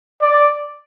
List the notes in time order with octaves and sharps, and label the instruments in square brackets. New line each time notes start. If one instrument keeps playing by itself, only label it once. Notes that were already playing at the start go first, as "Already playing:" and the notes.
[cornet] D5